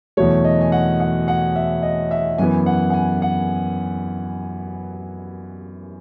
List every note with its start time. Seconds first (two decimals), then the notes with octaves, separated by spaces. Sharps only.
0.17 E2 B2 F#3 A3 C#5
0.44 D#5
0.61 G#5
0.72 F#5
1.00 F#5
1.28 F#5
1.56 E5
1.83 D#5
2.11 E5
2.38 F#2 E3 B3 G#5
2.66 F#5
2.90 F#5
2.94 G#5
3.22 F#5